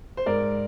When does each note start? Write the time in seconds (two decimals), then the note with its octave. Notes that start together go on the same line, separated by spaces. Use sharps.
0.17 C5
0.26 G#2 A#4 D5